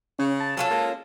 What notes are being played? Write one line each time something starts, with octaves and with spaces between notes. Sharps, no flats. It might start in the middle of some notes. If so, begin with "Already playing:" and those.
C#3 C#4
A5
F#3 C#4 F4 A4
G#3 A#3